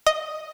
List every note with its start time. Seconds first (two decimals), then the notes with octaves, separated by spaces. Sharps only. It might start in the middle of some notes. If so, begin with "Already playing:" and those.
0.06 D#5